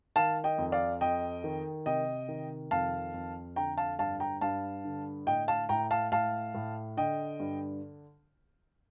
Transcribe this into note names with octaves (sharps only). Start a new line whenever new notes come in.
D#3 F5 A5
D#5 G5
F2
D5 F5
F2 D#5 G5
D#3
C3 D#5 G5
D#3
F2 F5 A5
F2
D3 G5 A#5
F5 A5
G2 F5 A5
G5 A#5
G2 F5 A5
D3
A2 D#5 G5
F5 A5
A2 G5 A#5
F5 A5
A2 F5 A5
A2
D3 D#5 G5
G2